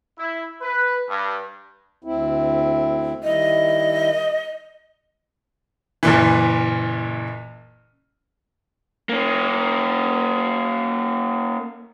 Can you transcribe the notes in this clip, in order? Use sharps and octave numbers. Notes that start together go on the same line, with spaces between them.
E4
B4
G2
D2 C4 E4
D#3 G3 E4 D#5
F#1 A#2 E3
A#3 C#4